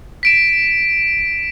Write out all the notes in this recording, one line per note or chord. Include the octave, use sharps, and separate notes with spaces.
B6 D7 E7